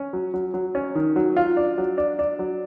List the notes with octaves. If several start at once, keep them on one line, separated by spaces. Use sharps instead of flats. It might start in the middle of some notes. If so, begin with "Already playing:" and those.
Already playing: C#4
F#3
F#3
F#3
C#4
D#3
F#3
F4
D4
F#3
D4
D4
F#3